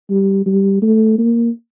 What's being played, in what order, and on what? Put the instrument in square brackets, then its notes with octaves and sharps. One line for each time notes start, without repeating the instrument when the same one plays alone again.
[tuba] G3
G3
A3
A#3